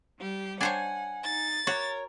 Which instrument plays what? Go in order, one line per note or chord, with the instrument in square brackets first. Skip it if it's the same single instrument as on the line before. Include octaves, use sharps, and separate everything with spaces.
[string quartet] G3 G4
[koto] D4 C5 C#5 [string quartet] F#5 [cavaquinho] G#5
[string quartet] D#4 [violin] A6
[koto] F#4 [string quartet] A#4 [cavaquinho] C#5